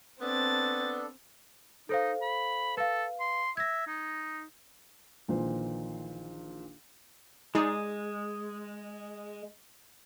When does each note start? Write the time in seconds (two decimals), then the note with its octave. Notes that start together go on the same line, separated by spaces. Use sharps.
0.21 B3 C4 D4 A4 A6
1.89 D#4 A4 C5 F5
2.22 B5
2.77 A4 B4 F5
3.20 C6
3.57 E5 G#6 A#6
3.87 D#4
5.28 A#1 A#2 D#3 E3 C5
7.55 G#3 D#4 G#4 D5